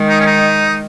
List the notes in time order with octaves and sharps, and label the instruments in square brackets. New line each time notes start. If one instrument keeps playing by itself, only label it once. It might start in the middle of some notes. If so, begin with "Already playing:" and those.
Already playing: [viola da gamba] D#3 G#3
[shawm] D#4
C#4
D#4